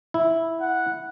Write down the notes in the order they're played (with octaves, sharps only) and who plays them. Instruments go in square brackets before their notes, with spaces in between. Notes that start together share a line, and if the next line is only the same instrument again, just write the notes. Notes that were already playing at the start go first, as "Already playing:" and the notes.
[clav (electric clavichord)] E4
[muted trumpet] F#5